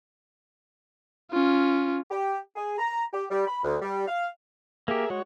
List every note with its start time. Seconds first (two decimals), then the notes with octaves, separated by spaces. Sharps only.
1.31 C#4 F4
2.11 G4
2.56 G#4
2.78 A#5
3.13 G4
3.31 G3
3.47 B5
3.64 D2
3.82 G3
4.08 F5
4.88 A#3 G4 G#4 A#4 E5
5.10 G#3 F#4 C#5